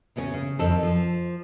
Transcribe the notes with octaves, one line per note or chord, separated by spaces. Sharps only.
E2 C#3 B3 C#4
C#3
F2 D#3 C4 A4
F3